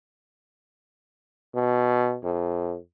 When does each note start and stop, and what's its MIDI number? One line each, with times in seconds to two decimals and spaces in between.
1.55 2.18 47
2.24 2.77 41